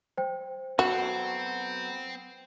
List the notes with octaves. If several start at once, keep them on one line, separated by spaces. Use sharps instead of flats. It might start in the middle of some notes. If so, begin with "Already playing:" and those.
C5 G5
F#3 B3 C4 F#4 A4